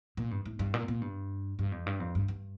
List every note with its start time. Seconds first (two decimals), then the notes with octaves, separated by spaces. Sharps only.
0.17 A#2
0.31 G2
0.46 A2
0.59 G2
0.74 A#2
0.88 A#2
1.02 G2
1.59 G2
1.72 F2
1.86 G2
2.00 F2
2.15 G2
2.28 G2